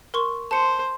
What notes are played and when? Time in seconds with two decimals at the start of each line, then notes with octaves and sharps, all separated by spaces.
0.14 A#4 C6 C#6
0.51 C5 A5 C#7